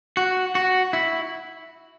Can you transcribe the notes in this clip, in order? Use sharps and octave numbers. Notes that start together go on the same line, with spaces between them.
F#4
F#4
E4